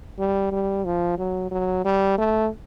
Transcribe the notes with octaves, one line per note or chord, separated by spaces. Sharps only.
G3
G3
F3
F#3
F#3
G3
A3